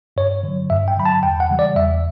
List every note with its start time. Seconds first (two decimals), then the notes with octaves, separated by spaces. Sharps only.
0.17 G2 C#5
0.43 D3 F#3
0.70 G2 E5
0.88 G5
0.97 D3 F#3 B5
1.06 A5
1.23 E2 G5
1.40 F#5
1.50 C#3 E3 G3
1.59 D5
1.76 E2 E5